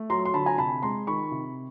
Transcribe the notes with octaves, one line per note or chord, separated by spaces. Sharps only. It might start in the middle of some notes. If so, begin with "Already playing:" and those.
Already playing: A3
F#3 A#5 C6
C6
D3 A5 B5
G#5 A#5
C3 A5 B5
G#3 A#5 C6
D#3 B5 C#6
C3